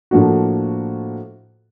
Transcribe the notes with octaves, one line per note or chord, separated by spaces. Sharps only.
A2 F3 A#3 D4 F#4